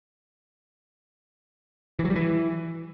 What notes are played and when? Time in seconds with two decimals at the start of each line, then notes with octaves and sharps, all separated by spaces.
1.99 E3
2.05 F#3
2.10 G3
2.16 E3